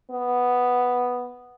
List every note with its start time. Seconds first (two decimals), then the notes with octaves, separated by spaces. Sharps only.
0.11 B3